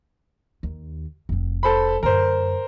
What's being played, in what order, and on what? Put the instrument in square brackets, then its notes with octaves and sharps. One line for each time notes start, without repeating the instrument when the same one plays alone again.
[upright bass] D#2
F1 C4
[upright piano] A4 C5 B5
[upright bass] F#2 D3 [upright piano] A#4 C5